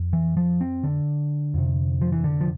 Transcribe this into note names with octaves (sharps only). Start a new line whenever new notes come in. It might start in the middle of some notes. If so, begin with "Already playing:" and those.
Already playing: F2
E3
F3
C4
D3
F2 C3
F3
E3
D3
F3